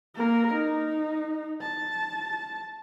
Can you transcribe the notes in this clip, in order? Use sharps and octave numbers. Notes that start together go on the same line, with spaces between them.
A#3 A#4
D#4
A5